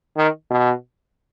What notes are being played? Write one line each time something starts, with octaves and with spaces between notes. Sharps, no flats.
D#3
B2